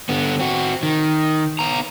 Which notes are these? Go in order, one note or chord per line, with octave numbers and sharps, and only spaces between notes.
D3 B3
C4 F#4
D#3
B3 A#5